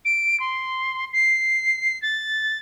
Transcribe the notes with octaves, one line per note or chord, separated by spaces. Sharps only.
D7
C6
C7
A6